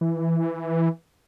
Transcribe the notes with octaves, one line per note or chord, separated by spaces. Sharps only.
E3